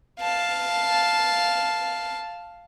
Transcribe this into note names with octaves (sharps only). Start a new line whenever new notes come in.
F5 A5